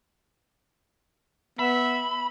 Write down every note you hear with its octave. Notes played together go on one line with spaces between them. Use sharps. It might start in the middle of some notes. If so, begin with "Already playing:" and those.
B3 E5 B5